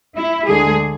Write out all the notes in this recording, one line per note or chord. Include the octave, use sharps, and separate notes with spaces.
E4
D2 D3 G#3 G#4